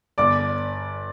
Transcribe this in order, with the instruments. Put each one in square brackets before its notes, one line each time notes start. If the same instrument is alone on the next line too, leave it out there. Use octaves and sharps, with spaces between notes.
[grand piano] G1 D5 D6